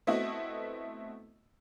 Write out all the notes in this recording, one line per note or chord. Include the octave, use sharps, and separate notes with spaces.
A3 B3 C4 E4 F#4 D#5